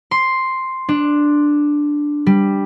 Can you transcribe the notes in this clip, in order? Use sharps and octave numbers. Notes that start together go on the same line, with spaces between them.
C6
D4
G3